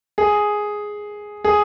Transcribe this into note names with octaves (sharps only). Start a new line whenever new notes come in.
G#4
G#4